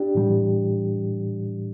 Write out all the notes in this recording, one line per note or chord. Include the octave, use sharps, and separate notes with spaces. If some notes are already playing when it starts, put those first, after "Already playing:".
Already playing: D4 G4
A2 E3 G3